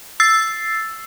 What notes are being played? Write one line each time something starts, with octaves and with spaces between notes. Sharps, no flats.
E6 A6 C7